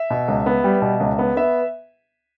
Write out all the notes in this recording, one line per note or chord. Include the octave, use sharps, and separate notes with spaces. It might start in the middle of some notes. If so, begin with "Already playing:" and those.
Already playing: E5
B2
C#2
B3
G3
B2
C#2
B3
B3 E5